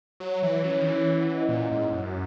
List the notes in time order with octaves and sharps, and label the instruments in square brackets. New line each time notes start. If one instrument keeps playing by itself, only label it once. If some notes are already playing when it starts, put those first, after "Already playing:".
[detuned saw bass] F#3 [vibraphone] C#5
[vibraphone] C#5
[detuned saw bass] E3
[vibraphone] C#5
[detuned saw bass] F#3 [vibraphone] C#4
[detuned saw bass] E3
[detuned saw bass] D#3 [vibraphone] C#5
[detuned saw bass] E3 [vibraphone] C#4
[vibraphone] E4
F#5
D#5
[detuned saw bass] A#2 [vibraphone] D#5
[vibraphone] D#5
[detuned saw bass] G#2
[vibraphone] A#4
[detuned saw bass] F#2 [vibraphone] F#4
[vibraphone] F#4